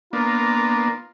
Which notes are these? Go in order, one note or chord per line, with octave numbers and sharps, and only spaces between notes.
A#3 B3 D4 F4 A#5